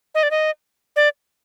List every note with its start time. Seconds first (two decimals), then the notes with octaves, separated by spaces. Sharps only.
0.15 D#5
0.23 D5
0.31 D#5
0.96 D5